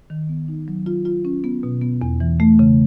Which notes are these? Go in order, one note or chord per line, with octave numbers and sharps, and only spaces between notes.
D#3
B3
D#4
F#3
F4
F4
C#4
B3
B2
B3
E2
E3
A3
C#3